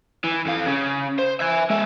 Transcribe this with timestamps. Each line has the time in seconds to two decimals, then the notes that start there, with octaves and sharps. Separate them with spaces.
0.24 E3
0.46 F2 F5
0.66 C#3
1.19 C5
1.40 E5 G#5
1.70 G#3 E5